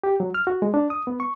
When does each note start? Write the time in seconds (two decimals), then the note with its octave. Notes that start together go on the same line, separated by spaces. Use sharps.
0.04 G4
0.20 F#3
0.34 F6
0.47 F#4
0.62 G#3
0.74 D4
0.90 D#6
1.07 B3
1.20 C#6